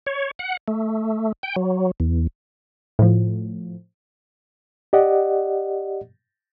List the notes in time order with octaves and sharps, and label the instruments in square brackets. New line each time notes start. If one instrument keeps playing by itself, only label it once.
[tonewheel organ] C#5
F#5
A3
G5
F#3
E2
[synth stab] A2 F3
[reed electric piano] G4 D5 D#5 F#5